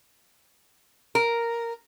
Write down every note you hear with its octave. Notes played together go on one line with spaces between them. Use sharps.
A#4